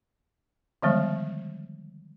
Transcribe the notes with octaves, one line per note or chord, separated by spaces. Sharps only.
D3 D#3 F3 G3 G#3 B3